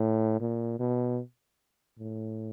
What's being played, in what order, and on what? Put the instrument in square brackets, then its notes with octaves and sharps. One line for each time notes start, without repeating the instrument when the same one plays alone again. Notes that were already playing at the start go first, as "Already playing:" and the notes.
Already playing: [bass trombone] A2
A#2
B2
A2